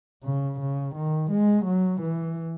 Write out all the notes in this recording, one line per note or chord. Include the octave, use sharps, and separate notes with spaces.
C#3
C#3
D#3
G#3
F#3
E3